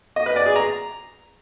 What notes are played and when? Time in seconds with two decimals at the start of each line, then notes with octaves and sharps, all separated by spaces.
0.16 D#5
0.26 B4
0.36 D5
0.46 G#4
0.56 A#5